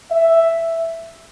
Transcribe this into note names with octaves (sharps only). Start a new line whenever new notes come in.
E5